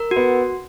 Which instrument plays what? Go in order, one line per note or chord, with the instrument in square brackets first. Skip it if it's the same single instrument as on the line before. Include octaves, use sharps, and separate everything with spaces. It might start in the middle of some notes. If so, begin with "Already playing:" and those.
Already playing: [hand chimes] A#4
F#4
[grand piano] B3